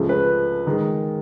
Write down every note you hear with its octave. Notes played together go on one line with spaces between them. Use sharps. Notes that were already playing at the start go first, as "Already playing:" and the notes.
Already playing: C#2 C#3 F3 A3
B4
D#3 G#3